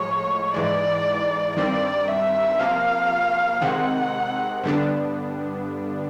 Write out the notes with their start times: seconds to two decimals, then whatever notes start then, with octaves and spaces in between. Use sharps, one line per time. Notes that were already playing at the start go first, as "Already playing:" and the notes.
Already playing: A2 F3 G#3 C#5
0.54 G#2 E3 G#3 D5
1.56 G2 D#3 G3 C4 D5
2.08 E5
2.59 C3 F3 A#3 F5
3.62 C3 D#3 G#3 C4 F#5
4.63 G2 D3 G3 B3 D4